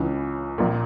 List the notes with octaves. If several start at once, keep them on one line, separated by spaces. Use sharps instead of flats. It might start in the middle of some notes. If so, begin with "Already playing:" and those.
Already playing: C#2 C#3 E3
A#1 A#2